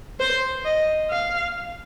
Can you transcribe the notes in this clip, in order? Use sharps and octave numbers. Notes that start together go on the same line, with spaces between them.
C5
D#5
F5